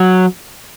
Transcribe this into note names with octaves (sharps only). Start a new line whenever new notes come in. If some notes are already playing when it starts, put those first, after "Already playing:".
Already playing: F#3